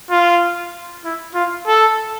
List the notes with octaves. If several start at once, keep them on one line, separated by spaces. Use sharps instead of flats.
F4
E4
F4
A4